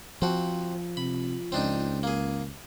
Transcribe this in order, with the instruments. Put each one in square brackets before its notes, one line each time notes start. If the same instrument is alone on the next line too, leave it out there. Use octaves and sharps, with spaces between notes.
[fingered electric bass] F3 [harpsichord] C4 F#4
[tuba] C3 [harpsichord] B5
[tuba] C#2 [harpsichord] C4 D4 D#4
[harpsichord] A#3 G#4